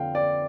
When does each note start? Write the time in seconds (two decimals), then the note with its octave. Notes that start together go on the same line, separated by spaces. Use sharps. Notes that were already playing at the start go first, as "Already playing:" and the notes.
Already playing: F2 D3 F3 F5 G5
0.15 D5